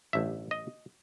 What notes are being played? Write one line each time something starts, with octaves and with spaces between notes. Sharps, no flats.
A1 G2 D3 E5
D#5